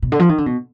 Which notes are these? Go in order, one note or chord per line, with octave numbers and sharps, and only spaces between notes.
B2
D3
F3
D#3
D3
B2